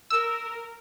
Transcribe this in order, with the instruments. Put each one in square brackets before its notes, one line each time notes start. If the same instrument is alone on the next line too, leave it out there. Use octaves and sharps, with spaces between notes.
[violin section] A#4 [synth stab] E6